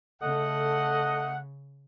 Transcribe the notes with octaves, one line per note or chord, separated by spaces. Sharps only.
C#3 A3 A4 D#5 F#5